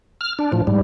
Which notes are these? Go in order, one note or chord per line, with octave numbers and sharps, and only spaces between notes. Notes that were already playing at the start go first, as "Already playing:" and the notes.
F6
D4
A2 F3
G#2 G3